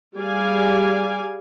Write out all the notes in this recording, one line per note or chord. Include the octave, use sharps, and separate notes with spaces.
G3 G#4 D5 F5 G#5